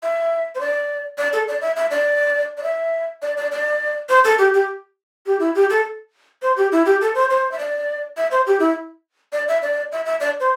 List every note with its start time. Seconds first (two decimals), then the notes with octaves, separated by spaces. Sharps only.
0.03 E5
0.55 C5
0.60 D5
1.18 D5
1.33 A4
1.48 D5
1.61 E5
1.76 E5
1.91 D5
2.57 D5
2.63 E5
3.22 D5
3.37 D5
3.51 D5
4.09 C5
4.24 A4
4.38 G4
4.54 G4
5.26 G4
5.40 E4
5.55 G4
5.70 A4
6.42 C5
6.57 G4
6.72 E4
6.86 G4
7.01 A4
7.15 C5
7.30 C5
7.51 E5
7.59 D5
8.17 E5
8.31 C5
8.47 G4
8.60 E4
9.33 D5
9.48 E5
9.62 D5
9.92 E5
10.05 E5
10.20 D5
10.40 C5